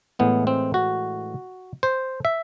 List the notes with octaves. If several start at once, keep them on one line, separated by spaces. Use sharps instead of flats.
A2 E3 G#3 B3
C4
F#4
C5
E5